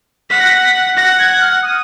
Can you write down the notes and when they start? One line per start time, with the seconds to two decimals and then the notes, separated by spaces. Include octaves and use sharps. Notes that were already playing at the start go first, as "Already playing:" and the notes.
0.30 F#5 B6
0.40 A#6
0.49 B6
0.64 B6
0.97 F#5 A#6
1.19 G#6
1.41 F6
1.63 D#6